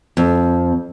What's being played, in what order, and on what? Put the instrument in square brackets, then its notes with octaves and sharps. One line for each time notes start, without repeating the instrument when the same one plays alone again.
[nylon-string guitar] F2